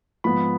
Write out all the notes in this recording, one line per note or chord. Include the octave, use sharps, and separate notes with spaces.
G#2 F3 B3 B5